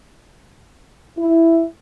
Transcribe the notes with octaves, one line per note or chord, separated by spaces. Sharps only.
E4